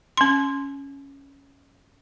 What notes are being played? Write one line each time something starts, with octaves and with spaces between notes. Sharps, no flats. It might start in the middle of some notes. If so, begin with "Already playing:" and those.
C#4 C6